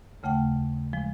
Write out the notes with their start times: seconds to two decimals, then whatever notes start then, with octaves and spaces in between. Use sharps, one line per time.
0.23 D#2 C#3 A3 F#5 G5
0.93 F3 G#3